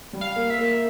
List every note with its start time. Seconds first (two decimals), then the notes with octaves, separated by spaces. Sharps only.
0.13 G3
0.21 F5
0.36 A#3
0.50 E5
0.58 A#3